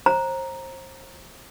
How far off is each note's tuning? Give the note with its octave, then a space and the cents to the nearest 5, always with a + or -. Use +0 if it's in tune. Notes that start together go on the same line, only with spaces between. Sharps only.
C5 +30 A#5 +0